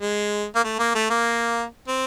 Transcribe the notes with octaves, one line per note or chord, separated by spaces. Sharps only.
G#3
A#3
A3
A#3
A3
A#3
C4